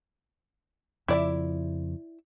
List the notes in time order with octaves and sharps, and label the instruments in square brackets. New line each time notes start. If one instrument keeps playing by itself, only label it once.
[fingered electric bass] F2 C#3 F3 [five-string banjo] E4 D5 E5